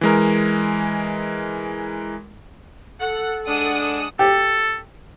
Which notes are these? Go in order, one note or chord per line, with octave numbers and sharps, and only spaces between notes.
E3 G#3 A#4
A4 F#5
G#3 D4 F#5 D#6
G4 A4